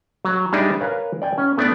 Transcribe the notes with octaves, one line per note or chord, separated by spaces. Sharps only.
F#3
G3 D4 D#4 G#4 D5 E5
A#4 B4 C#5 F5 G#5 A#5
D5 G5 G#5
C#4
A3 B3 D4 D5